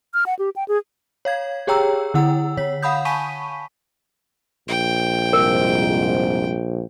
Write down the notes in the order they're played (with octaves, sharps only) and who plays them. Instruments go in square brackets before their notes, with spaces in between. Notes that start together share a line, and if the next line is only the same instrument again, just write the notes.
[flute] F6
F#5
G4
G5
G#4
[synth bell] C#5 F5 G#6
G4 G#4 C#5 G5 A#5 E6
D3 E4 F#5 E6
D3 C#5 B6
F5 F#5 B5 D#6 G6
G#5 A5 B5 C#6 B6 D#7
[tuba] A#1 [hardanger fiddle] G5
[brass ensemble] C2 F2 G#2 [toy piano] A#4